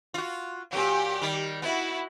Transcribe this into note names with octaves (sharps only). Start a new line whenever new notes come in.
F4 F#4
A#2 F#3 G4
D#3 G3
B3 E4 F#4